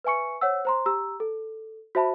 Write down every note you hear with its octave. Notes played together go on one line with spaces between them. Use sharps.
B4 E5 G#5 C#6 C#7
C5 C#5 F#5 E6
C5 A#5 C6
G4 A#5 E6
A4
F#4 C5 E5 A5 B5